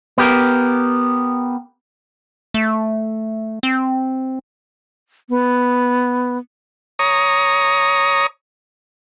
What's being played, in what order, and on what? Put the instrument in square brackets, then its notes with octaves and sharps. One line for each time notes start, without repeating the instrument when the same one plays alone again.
[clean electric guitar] B3 G4 A#4
[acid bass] A3
C4
[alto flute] B3
[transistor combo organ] C#5 A#5 D#6